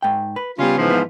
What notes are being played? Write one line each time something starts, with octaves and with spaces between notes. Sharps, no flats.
G#2 G5
B4
C#3 G3 B3 C#4 F4
G#2 E3 F3
B3 F4